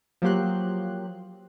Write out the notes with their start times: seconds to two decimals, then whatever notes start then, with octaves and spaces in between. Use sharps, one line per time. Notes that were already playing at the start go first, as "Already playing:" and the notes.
0.22 F3 F#3 A#3 G4 C6 F#6